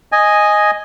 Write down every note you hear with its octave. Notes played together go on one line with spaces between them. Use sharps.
D#5 G#5